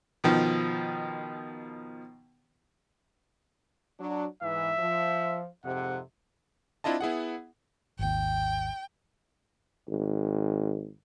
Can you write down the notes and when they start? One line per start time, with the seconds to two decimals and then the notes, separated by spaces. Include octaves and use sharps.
0.24 B2 D#3 F3
4.00 F#3 D4
4.43 G#2 E3 E5
4.78 F3
5.65 F2 G#2 C3 F#5
6.84 C4 D4 E4 F4 D#5 A5
7.01 B3 E4 G#4 F#5
7.99 G#1 D#2 G5
9.89 G#1